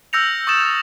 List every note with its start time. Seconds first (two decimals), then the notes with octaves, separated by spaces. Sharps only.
0.13 E6 F6 G6 A#6 C#7 F7
0.47 C#6 D#6 A6 E7
0.64 G6